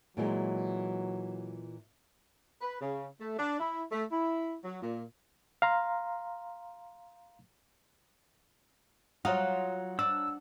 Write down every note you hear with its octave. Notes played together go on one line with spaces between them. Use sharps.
A#2 E3 F#3 G#3
B4
C#3
A3
D4
E4
A3
E4
F#3
A#2
F5 A#5 C6
F#3 F4 C#5 F#5 A#5 D#6
D4 E6